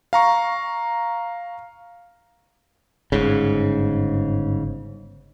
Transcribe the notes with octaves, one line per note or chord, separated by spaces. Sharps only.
F5 A#5 C#6
G1 G#2 C#3